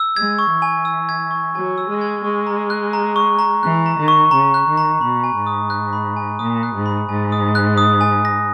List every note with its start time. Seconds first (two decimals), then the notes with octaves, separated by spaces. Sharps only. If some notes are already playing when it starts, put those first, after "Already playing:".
Already playing: E6
0.16 G#3 G#6
0.39 C#6
0.51 E3
0.62 G#5
0.85 E6
1.09 G#6
1.31 C#6
1.54 F#3 G#5
1.78 E6
1.89 G#3
2.01 G#6
2.24 G#3 C#6
2.47 A#5
2.70 F#6
2.93 A#5
3.16 C#6
3.39 A#5
3.62 E3 F#6
3.86 A#5
3.97 D#3
4.08 C#6
4.31 C#3 A#5
4.54 F#6
4.67 D#3
4.78 A#5
5.01 B2 B5
5.24 G#5
5.36 G#2
5.47 D#6
5.70 F#6
5.93 B5
6.16 G#5
6.39 A#2 D#6
6.63 F#6
6.74 G#2
6.86 B5
7.09 G#2 G#5
7.32 D#6
7.55 F#6
7.78 D#6
8.01 G#5
8.25 A#6